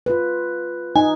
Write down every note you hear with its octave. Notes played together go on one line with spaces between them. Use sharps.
F4 B4
D#4 G#5